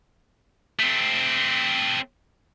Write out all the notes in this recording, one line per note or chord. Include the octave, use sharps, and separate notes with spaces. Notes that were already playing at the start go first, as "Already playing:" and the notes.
A3 C4